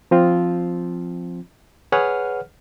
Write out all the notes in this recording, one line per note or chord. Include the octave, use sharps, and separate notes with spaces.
F3 C4 F4
G#4 B4 C#5 F#5 F6